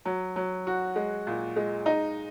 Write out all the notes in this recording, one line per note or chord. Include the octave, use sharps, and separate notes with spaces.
F#3
F#3
F#4
G#3
A#2
G#3
D#4